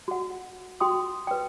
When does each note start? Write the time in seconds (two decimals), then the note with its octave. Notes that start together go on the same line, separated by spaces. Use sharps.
0.08 F#4 F#5
0.80 F#4 G5 C6 D#6
1.27 B4 G5